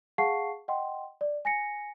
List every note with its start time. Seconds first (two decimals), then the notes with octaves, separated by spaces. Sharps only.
0.18 G#4 F5 F#5 A5 C#6 C7
0.68 D#5 F#5 G5 C6
1.21 D5
1.45 G#5 A#6 C#7